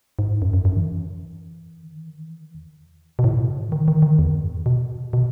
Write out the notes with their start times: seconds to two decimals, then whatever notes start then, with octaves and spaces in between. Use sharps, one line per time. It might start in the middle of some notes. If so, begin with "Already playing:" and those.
0.19 G#2
0.42 F#2
0.53 F#2
0.65 F#2
0.77 E3
1.83 D#3
1.95 E3
2.06 D#3
2.18 E3
2.26 D#3
2.30 E3
2.42 D#3
2.54 E2
3.19 B2
3.24 A2
3.36 B2
3.48 C#3
3.60 D#3
3.72 D#3
3.88 D#3
4.02 D#3
4.19 E2
4.31 F#2
4.43 G#2
4.54 A2
4.66 B2
5.13 B2